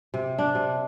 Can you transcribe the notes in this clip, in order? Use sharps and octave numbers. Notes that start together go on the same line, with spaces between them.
C3
D4
C3